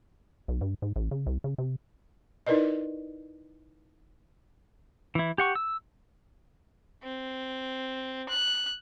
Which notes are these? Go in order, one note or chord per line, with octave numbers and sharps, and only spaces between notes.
B1
G2
G#2
A1
C#3
C2
C#3
C3
D#4 E4 A#4 B4 D5 D#5
E3 E4
G4 F#5 C#6
E6
C4
F#6